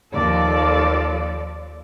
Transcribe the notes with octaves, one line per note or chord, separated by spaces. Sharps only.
D#2 F3 A4 D5